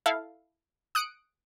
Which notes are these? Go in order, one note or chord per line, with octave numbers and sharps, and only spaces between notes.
E4 A4 F5
D#6 F#6 C#7 D7